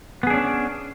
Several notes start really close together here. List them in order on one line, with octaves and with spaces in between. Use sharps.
B3 G#4 D4 C#4